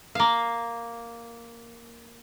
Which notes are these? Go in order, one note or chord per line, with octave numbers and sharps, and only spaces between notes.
A#3 F5